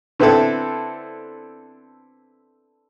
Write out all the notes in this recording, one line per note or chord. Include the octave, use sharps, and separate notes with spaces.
D3 B3 C4 E4 A4